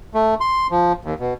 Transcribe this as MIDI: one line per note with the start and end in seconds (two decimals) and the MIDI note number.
0.14 0.35 57
0.40 0.67 84
0.71 0.93 53
1.05 1.14 39
1.19 1.34 47